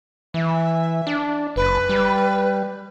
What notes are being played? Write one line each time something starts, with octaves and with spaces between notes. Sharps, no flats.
E3 E5
D4
F#1 B4
G3